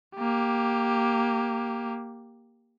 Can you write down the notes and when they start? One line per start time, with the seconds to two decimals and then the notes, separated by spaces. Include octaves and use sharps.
0.16 A#3 G4